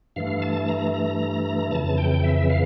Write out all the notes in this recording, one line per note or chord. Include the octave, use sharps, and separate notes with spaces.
G2 E3 A3 F5
A5
A#5
A#5
F2 C#3 E3 A5
G5
E5
F5